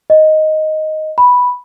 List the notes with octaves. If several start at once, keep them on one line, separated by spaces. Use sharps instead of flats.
D#5
B5